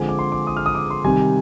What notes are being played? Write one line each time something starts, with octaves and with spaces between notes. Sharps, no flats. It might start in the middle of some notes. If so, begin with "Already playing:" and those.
Already playing: D3 F3 G#3 C4 G#5
D6
C6
D6
D#6
F6
D#6
D6
C6
C3 D#3 G3 G#5